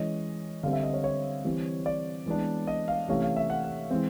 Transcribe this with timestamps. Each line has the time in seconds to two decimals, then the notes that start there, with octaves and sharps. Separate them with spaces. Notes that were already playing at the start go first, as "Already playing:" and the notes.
Already playing: E3 G#3 C#4 D#5
0.63 D3 G3 C4 F5
0.73 E5
0.83 D#5
0.94 C#5
1.04 C#5
1.44 E3 G3 C4
1.86 D5
2.26 E3 G#3 B3 D4
2.67 D#5
2.88 F5
3.08 C3 E3 A3 C#4 F5
3.22 F5
3.36 E5
3.50 F#5
3.64 F#5
3.91 E3 G#3 C4